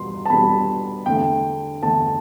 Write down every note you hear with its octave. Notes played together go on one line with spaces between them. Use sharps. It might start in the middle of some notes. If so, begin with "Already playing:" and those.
Already playing: E2 B2 G3 B3 C6
A5
E2 B2 G3 B3 B5
E2 D3 A3 G5
E2 D3 A3 A5